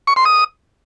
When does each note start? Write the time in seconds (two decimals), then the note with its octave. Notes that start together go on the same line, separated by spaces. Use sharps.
0.07 C#6
0.16 C6
0.25 D#6